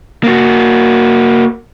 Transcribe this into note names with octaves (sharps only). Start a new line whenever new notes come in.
A#3 F#4